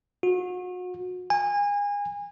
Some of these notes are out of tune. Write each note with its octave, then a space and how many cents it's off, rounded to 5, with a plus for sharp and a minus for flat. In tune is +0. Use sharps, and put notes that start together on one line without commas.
F#4 -35
G#5 -30